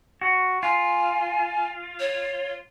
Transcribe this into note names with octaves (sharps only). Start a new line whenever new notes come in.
F#4
F4 G#5
C#5